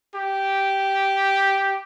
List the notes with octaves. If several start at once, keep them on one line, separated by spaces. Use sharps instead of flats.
G4